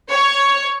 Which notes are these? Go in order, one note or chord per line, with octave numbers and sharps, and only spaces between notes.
C#5